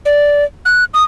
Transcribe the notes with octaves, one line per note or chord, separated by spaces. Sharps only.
D5
F#6
D#6